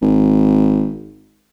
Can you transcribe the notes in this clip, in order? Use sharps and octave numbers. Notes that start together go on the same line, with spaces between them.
G#1